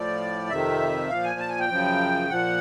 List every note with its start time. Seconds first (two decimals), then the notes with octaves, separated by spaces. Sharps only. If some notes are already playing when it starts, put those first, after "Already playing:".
Already playing: A2 F3 D5
0.50 F2 C3 D#3 E5
1.09 A#2 F3 F5
1.24 G#5
1.39 A5
1.49 G#5
1.59 G5
1.69 F#2 C#3 F3
2.30 A#2 F3 F#5